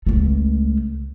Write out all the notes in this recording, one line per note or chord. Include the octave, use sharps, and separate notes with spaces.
C#2 A3